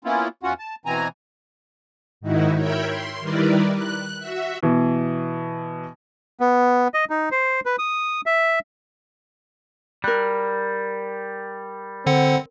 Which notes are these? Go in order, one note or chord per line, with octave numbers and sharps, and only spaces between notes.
A#3 B3 C#4 E4 F4
E2 C#4 F4 F#4 F#5
A5
B2 E3 C4 G#5 A#5
G#2 D#3 D#4 E4 F#4
A#4 C#5 E5 G5 B5
C6
D#3 G3 E4 A#4 B4 D5
F#6
F#4 E5
B2 E3
B3
D#5
D#4
C5
B4
D#6
E5
G3 A#4 F#6
D3 C4 F#5